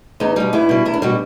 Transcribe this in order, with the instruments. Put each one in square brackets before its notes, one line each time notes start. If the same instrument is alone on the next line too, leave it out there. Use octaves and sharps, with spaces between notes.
[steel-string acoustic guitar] E2 D#4
B2 G3 D#4
E2 E4
B2 G3
E2 E4
D4
B2 G3 F#4